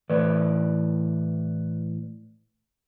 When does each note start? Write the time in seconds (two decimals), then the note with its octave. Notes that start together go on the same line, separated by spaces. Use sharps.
0.10 A2 E3 B4 D5